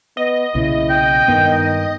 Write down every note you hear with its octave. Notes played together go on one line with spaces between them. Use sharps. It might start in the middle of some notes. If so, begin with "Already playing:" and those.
B3 D#5
B1 A#2 C#3 E4
G5
G2 D#3 B3